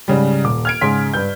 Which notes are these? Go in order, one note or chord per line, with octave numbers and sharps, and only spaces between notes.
G#2 C#3 G3
D#1 D6
F6 G#6 D7
G#2 C#3 G#4 C6 B6
G2 B4 G6